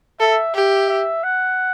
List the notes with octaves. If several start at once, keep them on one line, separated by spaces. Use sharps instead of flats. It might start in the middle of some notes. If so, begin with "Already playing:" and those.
A4 E5
G4 E5
E5
F#5